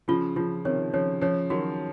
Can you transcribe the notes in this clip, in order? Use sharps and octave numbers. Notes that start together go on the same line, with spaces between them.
C#3 F3 F4
C#3 F3 F4
C3 D#3 C#5
C#3 F3 C#5
C#3 F3 C#5
D#3 F#3 F#4